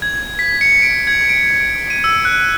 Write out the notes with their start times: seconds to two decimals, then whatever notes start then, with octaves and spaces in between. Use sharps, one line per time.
0.02 G#6
0.39 B6
0.61 C#7
0.82 D7
1.07 G#6
1.29 D7
1.90 D#7
2.04 E6
2.25 F#6